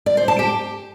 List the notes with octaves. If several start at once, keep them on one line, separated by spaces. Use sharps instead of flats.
D5
C5
A5
G4